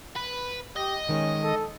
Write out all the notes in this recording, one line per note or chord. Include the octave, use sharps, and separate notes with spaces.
B4
G4 D#5
D#3 G#3 C#4
A4